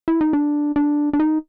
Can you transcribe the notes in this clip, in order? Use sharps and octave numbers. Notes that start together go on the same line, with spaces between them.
E4
D#4
D4
D4
D4
D#4